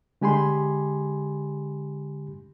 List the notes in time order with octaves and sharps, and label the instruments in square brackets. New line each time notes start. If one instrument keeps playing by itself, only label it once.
[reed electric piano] D3 G#3 G4 G#5 B5 C6